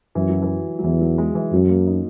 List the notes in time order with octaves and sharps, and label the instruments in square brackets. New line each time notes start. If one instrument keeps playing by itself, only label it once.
[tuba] F#2 [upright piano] E3
[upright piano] F#3
E3
F#3
[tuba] E2 [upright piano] E3
[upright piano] F#3
G#3
E3
[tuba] F#2 [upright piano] F#3
[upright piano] A#3
D#4